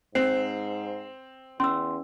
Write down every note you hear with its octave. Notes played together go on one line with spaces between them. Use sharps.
G#2 C4 C5 C7
E2 C#4 C6 E6